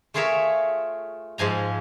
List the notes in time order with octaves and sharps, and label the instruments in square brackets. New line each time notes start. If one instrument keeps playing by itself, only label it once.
[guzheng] A3 F4 G#4 A#4 C#5 E5
G#2 F3 G#5 A#5